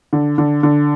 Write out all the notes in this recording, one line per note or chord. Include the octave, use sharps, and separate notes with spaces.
D3
D3
D3